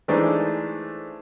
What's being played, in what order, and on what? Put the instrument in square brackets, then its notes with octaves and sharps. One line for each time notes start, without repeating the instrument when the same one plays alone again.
[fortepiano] E3 G#3 A3 D4 D#4 C5